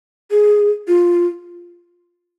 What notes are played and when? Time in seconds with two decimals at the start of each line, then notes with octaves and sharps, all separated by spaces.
0.31 G#4
0.88 F4